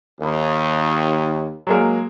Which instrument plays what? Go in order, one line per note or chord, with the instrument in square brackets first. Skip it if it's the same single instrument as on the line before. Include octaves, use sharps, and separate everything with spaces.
[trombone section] D#2
[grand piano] F#3 G#3 A#3